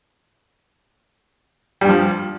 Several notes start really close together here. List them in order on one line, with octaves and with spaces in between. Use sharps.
G3 G2 F3